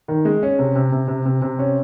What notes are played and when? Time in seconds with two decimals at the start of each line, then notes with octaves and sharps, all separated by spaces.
0.08 D#3
0.25 G#3
0.43 C#4
0.59 C3
0.76 C3
0.92 C3
1.08 C3
1.25 C3
1.42 C3
1.59 C#4